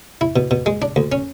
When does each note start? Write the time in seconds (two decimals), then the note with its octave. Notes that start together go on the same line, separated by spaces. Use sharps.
0.21 E4
0.36 B2
0.51 B2
0.66 G#3
0.82 D4
0.96 D2
1.12 C#4